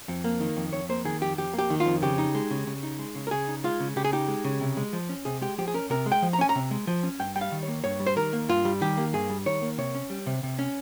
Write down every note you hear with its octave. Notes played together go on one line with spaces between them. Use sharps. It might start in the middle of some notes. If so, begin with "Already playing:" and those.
F2
A#3
D#3
F2
F2 C#5
A#3 C5
D#3 G#4
F2 G4
F2 G4
A#3
G4
D#3
F4
F2
C#3 G4
D#4
G#3
C#3
C#3
D#4
G#3
C#3
A#4
C#3 G#4
D#4
G#3 F4
C#3
C#3 G4
G#4
D#4 G4
G#3
C#3
C3
G#3
F3
C#4
C3 G#4
G#3 G4
F3 G4
G#4
C#4 A#4
C3 A#4
G#3
G5
F3
A#5
C#4 G#5
A#5
C3
G#3
F3
C#4
G2 G5
G3 G5
F5
D#3
C#5
A#3
G2 C#5
G3
C5
D#3 A#4
A#3
G2 F4
G3
D#3 G4
A#3
G2 G#4
G3
D#3 C#5
A#3
C3 C#5
C#4
G3
C3
C3
C#4